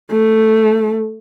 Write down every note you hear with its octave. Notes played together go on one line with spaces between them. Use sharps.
A3